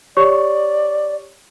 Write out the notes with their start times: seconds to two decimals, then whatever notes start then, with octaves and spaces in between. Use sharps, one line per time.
0.17 G4 C#5 D5 C#6